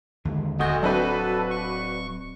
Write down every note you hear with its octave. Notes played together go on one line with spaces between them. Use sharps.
D#2 D3 G#3
D1 D2 F#4 D#5 G6
F#3 C4 D4 F#4 A4 B4
C#6